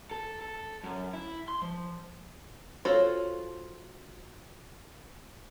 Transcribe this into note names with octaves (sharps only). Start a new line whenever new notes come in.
A4
A4
F#2
E4
C6
F3
F4 F#4 A4 C5 C#5